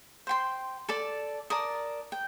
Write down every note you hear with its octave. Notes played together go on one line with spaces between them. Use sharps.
C5 G5 C6
A4 D5 A5 D6
A#4 D5 A5 D#6
G5